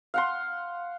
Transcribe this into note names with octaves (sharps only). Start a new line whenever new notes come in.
F5 F#5 C6